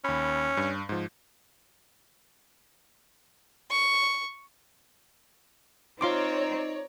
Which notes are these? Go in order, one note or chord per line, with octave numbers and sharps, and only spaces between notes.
D#2 C#4 B5
G2
G#2 F3
C#6
C4 D#4 F4 C#5 D5 A#5 C6 D6